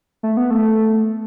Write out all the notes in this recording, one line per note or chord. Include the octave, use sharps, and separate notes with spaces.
A3
B3
A3